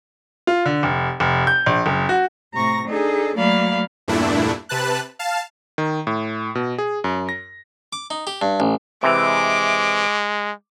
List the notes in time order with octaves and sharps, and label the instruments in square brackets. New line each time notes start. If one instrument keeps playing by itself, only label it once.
[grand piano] F4
D3
F1
F1
G6
A#1
F#1
F#4
[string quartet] A2 C3 A#5 C#6 A#6
D4 D#4 G#4 A4
F#3 A3 A#3 D5 F5 B5
[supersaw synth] E2 G2 A#2 A3 D4 E4
C3 B4 A5 F#6
F5 A5
[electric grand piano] D#3
A2
B2
G#4
F#2
A#6
[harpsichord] D6
D#4
G4
G2
A1
[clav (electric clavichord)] C3 E3 [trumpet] G#3 [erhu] D6